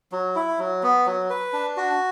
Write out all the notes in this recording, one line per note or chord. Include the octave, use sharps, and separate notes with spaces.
F#3
E4
F#3
B3
F#3
B4
D4
F#4